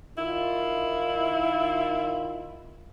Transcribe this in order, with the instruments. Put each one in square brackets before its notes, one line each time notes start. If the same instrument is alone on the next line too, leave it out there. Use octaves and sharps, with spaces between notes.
[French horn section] D#3 F4 [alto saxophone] E4